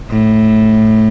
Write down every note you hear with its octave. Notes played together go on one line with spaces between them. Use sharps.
A2